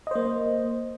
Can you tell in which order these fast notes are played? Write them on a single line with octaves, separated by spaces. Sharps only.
D#5 C5 A#3